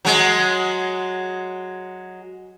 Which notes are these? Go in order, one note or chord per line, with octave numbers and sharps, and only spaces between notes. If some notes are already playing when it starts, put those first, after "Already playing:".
F#3 G#3